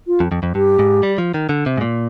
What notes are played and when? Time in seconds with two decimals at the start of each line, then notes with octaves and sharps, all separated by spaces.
0.07 F4
0.20 F2
0.32 F2
0.43 F2
0.55 G2 G4
0.79 G#2
1.03 G3
1.18 F3
1.34 D#3
1.49 D3
1.66 C3
1.77 G#2
1.81 A#2